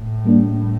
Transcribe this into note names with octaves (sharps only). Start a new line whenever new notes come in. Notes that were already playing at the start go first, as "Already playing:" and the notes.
Already playing: A2
G3 A#3 D4